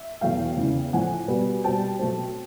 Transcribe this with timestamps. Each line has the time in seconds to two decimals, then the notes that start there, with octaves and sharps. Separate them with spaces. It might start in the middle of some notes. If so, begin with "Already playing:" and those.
Already playing: E5
0.21 E2 B2 F#3 A3 F5 G5
0.57 E2 C#3 E3
0.93 A2 F3 A3 C4 F#5 G#5
1.28 B2 G3 B3
1.64 B2 G3 C4 G5 A5
1.99 B2 F#3 A3 C4